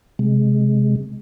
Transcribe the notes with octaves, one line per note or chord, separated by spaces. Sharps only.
C3 G#3